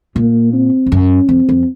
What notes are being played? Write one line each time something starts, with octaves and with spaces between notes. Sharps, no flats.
A#2 A#3
C4
F2
F#2 C#4
F2 C4
F2